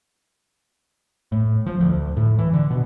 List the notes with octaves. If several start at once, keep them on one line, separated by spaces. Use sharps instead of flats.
A2
F3
D2
A2
E3
D3
B2